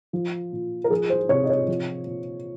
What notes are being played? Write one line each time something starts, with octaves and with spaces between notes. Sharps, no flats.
F3
A#2
A#4
F3 G#4
C5
C3 C#5
D#5
C#5
F3
A#2